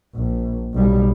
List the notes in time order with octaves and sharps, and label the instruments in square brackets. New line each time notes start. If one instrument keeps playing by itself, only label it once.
[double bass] A#1
B1 G3